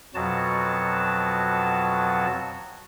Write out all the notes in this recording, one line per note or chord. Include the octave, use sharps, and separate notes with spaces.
F2 B2 F#3 F#4 A5